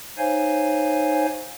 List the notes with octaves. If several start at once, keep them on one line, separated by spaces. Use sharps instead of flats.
D#4 C5 C#5 F5 G#5